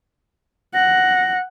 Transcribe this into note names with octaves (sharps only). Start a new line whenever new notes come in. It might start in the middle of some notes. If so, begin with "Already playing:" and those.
F#5 A#6